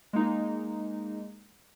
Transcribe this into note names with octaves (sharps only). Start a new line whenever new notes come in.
G#3 A#3 D#4